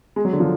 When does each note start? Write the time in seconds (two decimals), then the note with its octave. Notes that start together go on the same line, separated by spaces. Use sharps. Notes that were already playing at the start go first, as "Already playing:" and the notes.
0.16 G#3
0.25 F#3
0.33 D3
0.40 F3